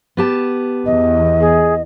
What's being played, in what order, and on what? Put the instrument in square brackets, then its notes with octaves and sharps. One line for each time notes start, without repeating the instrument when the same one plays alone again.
[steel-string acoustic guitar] B3 G4 A5
[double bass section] E2 [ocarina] D#5
[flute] G#4